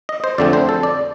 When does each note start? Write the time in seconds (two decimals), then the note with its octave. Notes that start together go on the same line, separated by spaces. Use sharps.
0.09 D#5
0.24 C5
0.38 F2 D3 A3 C4 D5
0.53 C5
0.69 A4
0.83 D5